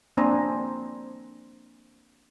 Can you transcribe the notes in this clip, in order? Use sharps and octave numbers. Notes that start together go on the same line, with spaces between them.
A#3 C4 D4 C5 G#5 A#5